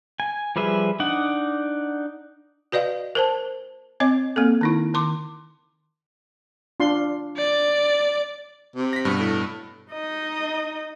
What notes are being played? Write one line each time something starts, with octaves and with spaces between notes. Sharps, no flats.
G#5
F3 G3 G#4 B4 E5
D4 D#4 D5 F#5
F#4 B4 D5 D#5 F5
A#4 C5 A5
C4 C#5 D#5 D6
A#3 C4 A4
D#3 D#4 E4
D#3 C6 D6
D4 F4 C6
D5
C3
A#6 B6
G2 B2
A2
D#4 D#5